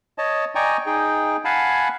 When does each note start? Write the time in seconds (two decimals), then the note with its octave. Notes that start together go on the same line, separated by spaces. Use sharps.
0.18 C#5 D#5 A5
0.55 D5 D#5 G5 G#5 A#5 C#6
0.86 D#4 G#4 G5
1.45 F5 F#5 G#5 A5 B5